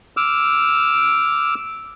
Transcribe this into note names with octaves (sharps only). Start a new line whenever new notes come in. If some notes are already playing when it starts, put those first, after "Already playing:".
D6 E6 F6